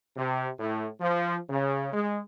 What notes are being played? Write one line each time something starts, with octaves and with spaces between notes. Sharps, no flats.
C3
A2
F3
C#3
G#3